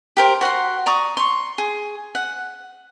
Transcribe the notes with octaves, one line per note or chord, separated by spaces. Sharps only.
G4 A#4 C5
F#4 F#5 A#5 C6
D5 A#5 C#6 D#6
C6 C#6
G#4
F#5